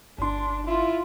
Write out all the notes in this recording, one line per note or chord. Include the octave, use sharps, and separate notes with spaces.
G1 D4 C6
E4 F4